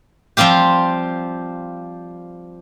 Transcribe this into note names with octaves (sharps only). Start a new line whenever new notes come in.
F3 G3 C4 F4 G4